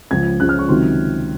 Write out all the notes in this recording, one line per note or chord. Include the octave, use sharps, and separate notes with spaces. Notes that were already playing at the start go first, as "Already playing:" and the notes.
C#2 C#3 F3 G#6
C#2 C#3 F3 F#6
F6
C#6
C#2 C3 D#3 F#3 C6